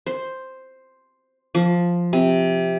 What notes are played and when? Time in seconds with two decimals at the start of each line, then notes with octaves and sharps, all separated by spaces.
0.07 C5
1.55 F3
2.13 C3